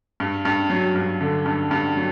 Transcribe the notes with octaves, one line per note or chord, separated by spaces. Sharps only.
G2
G2
F#3
G2
D3
G2
G2
F#3